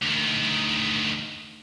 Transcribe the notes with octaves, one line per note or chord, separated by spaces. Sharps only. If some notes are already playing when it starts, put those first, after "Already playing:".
D2 D#3